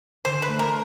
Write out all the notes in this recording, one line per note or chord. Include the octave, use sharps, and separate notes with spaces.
D3 C5
B4
A3
A#4